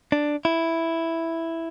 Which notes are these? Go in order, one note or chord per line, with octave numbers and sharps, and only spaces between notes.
D4
E4